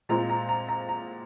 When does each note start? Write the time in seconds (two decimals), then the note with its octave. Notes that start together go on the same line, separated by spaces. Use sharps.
0.09 A#2 G#3 C4 F4 A#5
0.30 A#5
0.49 A#5
0.69 A#5
0.89 A#5